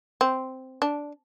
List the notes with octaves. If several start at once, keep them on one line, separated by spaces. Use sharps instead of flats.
C4
D4